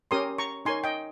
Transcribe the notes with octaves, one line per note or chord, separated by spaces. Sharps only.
C#4 G4 A#4 C#5 C6 D#6
A#5 C#6
D#4 A#4 C#5 G#5 C6
D#5 G5